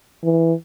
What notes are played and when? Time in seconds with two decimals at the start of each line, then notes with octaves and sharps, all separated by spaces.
0.24 E3